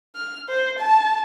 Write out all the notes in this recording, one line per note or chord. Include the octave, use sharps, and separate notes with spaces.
F6
C5
A5